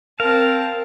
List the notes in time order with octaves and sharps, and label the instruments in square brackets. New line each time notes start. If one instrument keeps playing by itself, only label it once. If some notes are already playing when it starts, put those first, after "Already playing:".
[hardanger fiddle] C4 A5 [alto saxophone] A#4 [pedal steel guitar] F5